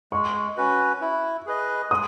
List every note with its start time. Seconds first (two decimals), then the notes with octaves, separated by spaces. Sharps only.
0.12 G#3 C#6
0.57 C#4 F#4 B4
1.01 E4
1.46 G#4 B4 D#5
1.90 G#3 D#6